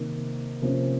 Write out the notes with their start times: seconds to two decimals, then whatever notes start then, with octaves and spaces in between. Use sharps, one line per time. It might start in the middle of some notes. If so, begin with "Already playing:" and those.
Already playing: C3 D#3 A#3
0.62 C3 F3 A#3 C#4